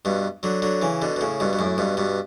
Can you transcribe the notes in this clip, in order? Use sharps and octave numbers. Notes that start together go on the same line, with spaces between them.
G2 B2
D3 F#3
D3 F#3
C#3 E3
B2 D3
B2
A2 C#3
G2 B2
B2
F#2 A2
G2 B2
G2 B2